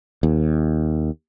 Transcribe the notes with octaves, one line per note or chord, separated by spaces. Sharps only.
D#2